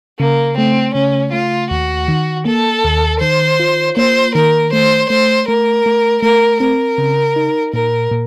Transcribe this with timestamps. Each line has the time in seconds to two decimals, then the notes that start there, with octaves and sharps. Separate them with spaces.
0.20 C#3 A#3
0.57 A3 C4
0.95 C#3 C#4
1.33 A3 F4
1.70 D#2 F#4
2.08 D#3
2.45 A#3 A4
2.84 D#2
3.21 D#3 C5
3.60 F4
3.97 A#3 C5
4.34 D#3 A#4
4.72 A3 C5
5.10 A3 C5
5.48 A3 A#4
5.86 A3
6.23 A3 A#4
6.60 C4 A#4
6.98 C#3
7.36 D#4
7.74 A#2 A#4
8.11 A#2